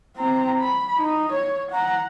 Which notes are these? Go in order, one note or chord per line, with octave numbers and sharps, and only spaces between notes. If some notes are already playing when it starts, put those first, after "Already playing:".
C4 A#5
B5
D#4
C#5
F#5 A#5